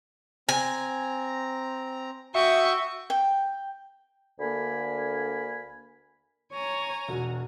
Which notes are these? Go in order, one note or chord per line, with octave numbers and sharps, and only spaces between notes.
C4 G#5 A#5
F#4 E5 G5 C#6 D#6
G5
D2 D3 A#3 A#4 G#5 B5
C#5 G#5 A#5
E1 F#4